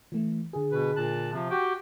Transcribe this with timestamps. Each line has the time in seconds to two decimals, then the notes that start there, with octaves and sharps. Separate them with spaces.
0.12 E3 A3
0.53 D3 G#4
0.71 B2 B4
0.96 A#2 A5 F#6
1.32 C3 F3
1.50 F#4 G4 G5